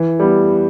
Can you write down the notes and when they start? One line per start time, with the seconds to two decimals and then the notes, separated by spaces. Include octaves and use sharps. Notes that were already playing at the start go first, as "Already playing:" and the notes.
Already playing: E3
0.19 G3 B3